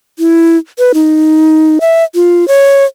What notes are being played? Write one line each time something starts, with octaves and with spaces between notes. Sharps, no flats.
E4
B4
D#4
E5
F4
C#5